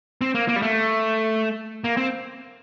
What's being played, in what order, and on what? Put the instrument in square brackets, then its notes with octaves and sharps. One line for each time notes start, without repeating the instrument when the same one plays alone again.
[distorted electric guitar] C4
A#3
A#3
G3
A3
A#3
C4